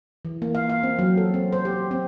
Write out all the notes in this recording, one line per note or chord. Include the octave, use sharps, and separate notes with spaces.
E3
A#3
F5
F5
C4
F#3
A4
C4
C5
G4
C4